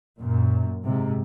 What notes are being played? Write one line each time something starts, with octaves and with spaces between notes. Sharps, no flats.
F#2 A#2
G#2 C3